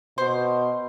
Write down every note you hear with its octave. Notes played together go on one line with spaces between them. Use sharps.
B2 C5